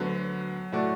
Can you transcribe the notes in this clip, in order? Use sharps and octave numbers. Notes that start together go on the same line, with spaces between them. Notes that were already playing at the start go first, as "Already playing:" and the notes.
Already playing: D2 D3 F#3 B3 F#4
A2 A3 F#4 D5